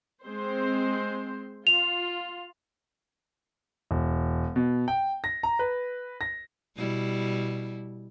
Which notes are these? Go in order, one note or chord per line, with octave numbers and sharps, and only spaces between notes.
G#3 C4 C5
F4 F7
E1
B2
G5
A#6
A#5
B4
A#6
B2 G3 E4